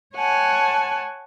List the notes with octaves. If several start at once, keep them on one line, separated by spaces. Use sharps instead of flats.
C#5 F#5 G#5 A5